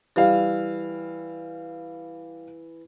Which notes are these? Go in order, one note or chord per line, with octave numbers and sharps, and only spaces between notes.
E3 G3 F5